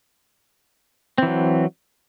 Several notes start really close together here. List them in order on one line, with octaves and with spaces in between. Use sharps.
C4 E3 F#3